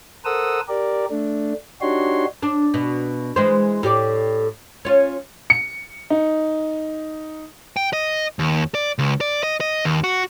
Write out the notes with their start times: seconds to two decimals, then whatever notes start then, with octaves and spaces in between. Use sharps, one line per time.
0.25 A4 A#4 C5 F#5 D#6 E6
0.68 G4 A#4 D5
1.10 A3 D4
1.81 D4 D#4 F#4 G4 C#5 C6
2.43 D4
2.74 B2
3.36 E3 G#3 C5
3.83 A2 G4 D5
4.85 C#4 F4
5.50 C#7
6.10 D#4
7.77 G5
7.93 D#5
8.39 D#2
8.75 D5
8.99 C#2
9.21 D5
9.43 D#5
9.61 D#5
9.85 D#2
10.04 F#4